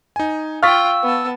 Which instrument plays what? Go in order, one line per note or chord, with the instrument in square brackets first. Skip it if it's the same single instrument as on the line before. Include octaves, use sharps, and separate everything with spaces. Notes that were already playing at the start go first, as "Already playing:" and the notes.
[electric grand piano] D#4 G#5
[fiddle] F4 G5 [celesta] F5 C#6 [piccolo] E6 [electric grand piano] F6 A6 B6
[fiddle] B3 A5